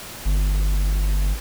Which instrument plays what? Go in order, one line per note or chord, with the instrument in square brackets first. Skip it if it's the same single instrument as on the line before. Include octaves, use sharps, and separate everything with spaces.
[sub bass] G1